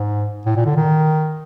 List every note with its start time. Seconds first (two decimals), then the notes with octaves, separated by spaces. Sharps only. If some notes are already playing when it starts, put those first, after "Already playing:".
Already playing: G#2
0.46 A2
0.56 A#2
0.66 D3
0.76 D#3